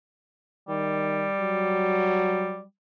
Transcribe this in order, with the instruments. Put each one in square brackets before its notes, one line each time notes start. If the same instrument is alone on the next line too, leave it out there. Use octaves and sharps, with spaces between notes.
[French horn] D#3 [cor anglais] G3
[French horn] F#3